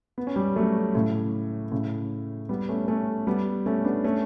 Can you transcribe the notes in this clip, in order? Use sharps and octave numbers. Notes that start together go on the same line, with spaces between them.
B3
C#4
G3 B3
F#3 A3
A2 C#3
A2 C#3
G3 B3
A3 C#4
A3 C#4
G3 B3
A3 C#4
B3 D4
A3 C#4